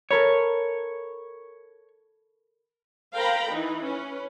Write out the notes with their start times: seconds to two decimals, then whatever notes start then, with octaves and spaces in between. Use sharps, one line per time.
0.11 A4 A#4 C#5 B5
3.16 A#4 C5 F5 G5 A#5 B5
3.49 E3 D#4 B4
3.88 C#4 B4